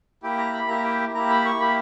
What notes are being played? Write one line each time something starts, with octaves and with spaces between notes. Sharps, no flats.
A#3 E4 G4 G5
A#5
B5
A#3 E4 G4 A#5
G5
A#3 E4 G4 A#5
B5
C#6
A#3 E4 G4 B5